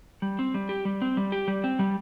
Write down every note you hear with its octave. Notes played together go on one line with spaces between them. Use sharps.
G3
C4
G3
G4
G3
C4
G3
G4
G3
C4
G3